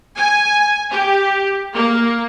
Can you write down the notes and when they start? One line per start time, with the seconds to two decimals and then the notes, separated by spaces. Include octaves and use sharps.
0.17 G#5
0.92 G4
1.74 A#3